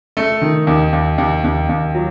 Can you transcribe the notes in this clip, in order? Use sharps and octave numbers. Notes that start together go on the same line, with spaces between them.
A3
D#3
D#2
D#2
D#2
D#2
D#2
F#3